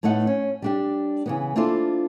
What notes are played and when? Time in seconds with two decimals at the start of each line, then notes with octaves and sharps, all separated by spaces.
0.03 A2 A3 B3 D#4 F#5
0.27 C#4
0.62 G3 D4 G4
1.26 C#3 E3 B3
1.56 A#3 D4 E4 F4 A4 C5